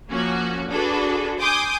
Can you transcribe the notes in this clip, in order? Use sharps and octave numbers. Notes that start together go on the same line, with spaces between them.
F3 A#3 C#4 F#4
D4 F#4 G#4 A4 B4
G#5 C6 D6 D#6 G6